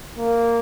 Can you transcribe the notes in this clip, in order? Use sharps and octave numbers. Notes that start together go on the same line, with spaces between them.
A#3